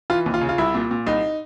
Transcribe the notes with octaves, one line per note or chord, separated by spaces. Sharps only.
E3 F4
D#2
F4
C#3
F4
C2 E4
A#2
A#2
C2 D#4